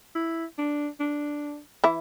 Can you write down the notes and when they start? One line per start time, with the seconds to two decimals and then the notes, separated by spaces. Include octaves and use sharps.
0.15 E4
0.58 D4
1.00 D4
1.84 E3 E4